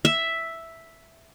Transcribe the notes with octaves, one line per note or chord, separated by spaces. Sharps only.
E5